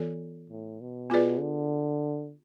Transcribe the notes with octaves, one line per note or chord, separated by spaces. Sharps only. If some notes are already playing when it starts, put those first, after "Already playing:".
Already playing: E3 B3 F4 A4 D5
A2
B2
B3 F4 G#4 B4 D5
D3